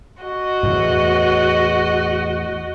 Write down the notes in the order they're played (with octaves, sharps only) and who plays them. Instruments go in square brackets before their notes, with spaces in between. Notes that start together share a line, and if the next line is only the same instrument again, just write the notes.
[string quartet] F#4 D#5
[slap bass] E2 A2